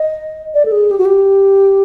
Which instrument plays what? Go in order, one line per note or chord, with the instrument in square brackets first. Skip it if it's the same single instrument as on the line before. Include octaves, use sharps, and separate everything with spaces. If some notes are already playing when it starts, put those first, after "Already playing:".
Already playing: [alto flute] D#5
D5
A4
G#4
G4
F#4
G4